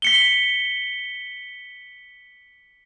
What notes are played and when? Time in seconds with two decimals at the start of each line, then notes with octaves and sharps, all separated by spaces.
0.02 B6 C#7 G7